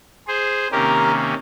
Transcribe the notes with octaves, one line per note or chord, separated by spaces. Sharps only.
G#4 C5
C3 D#3 A#3 C#4 G4 A#4